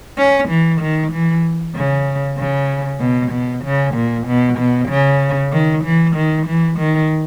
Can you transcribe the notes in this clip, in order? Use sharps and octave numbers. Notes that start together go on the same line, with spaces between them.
C#4
E3
D#3
E3
C#3
C#3
B2
B2
C#3
A#2
B2
B2
C#3
D#3
E3
D#3
E3
D#3